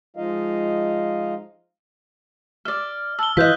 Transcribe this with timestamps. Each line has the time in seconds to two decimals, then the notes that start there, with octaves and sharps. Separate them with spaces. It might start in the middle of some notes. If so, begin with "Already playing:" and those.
0.16 F3 G#3 D#4 F4 D#5 F5
2.65 D5 E5 F6
3.19 A5 E6 G7
3.37 E3 F4 D#5 F#6 G6 B6